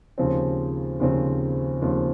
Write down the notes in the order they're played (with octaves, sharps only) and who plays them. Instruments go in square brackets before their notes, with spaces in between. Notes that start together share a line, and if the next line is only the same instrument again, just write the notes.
[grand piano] D#2 C#3 F3 C4
D#2 C#3 F3 C4
D#2 C#3 F3 C4